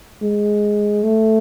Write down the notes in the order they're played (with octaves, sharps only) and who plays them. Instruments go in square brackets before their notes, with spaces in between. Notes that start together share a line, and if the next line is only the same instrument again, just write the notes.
[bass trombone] G#3
A3